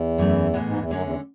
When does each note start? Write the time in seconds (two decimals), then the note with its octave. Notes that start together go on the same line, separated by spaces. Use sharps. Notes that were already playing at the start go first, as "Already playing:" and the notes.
Already playing: E2
0.18 F#2 E3 A3
0.54 A2 E3 G#3 B3
0.66 G#2
0.78 E2
0.90 F#2 D3 G#3 C#4
1.02 E2